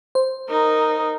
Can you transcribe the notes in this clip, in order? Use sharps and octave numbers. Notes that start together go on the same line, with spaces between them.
C5
D#4 A#4